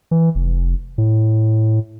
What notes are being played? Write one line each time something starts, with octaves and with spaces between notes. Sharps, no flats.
E3
F1
A2